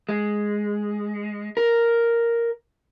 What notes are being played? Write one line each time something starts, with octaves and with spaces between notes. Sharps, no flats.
G#3
A#4